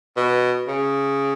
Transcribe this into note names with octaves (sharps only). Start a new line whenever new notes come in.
B2
C#3